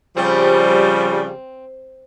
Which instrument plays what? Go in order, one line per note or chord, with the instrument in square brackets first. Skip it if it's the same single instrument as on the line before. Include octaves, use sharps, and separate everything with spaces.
[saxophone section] C#3 F3 G3 [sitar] C4